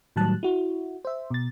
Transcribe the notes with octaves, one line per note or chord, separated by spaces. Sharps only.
A2 D#3 F#3 G3 A5 F#6
E4 F#4
C5 E5
B2 A6